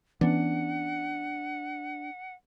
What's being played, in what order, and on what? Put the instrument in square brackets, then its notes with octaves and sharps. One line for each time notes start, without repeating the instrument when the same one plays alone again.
[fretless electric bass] E3 B3 C#4 [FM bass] D4 [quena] F#5